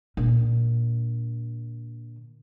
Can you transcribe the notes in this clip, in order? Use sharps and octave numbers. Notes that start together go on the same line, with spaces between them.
A#2 D3